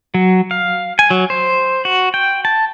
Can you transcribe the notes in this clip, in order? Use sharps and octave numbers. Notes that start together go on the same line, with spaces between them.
F#3
F5
G#5
F#3
C5
F#4
G5
A5